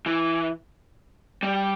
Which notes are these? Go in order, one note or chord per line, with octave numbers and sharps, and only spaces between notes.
E3
G3